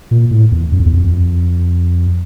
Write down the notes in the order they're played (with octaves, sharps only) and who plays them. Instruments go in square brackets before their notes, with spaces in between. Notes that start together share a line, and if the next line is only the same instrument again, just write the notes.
[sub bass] A#2
A2
E2
F#2
F2
E2
F2